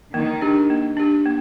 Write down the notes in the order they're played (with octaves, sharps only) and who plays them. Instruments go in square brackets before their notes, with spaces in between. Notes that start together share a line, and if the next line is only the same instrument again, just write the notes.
[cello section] D#3 [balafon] A#3
[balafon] D4 G4
A#3
D4 G4
A#3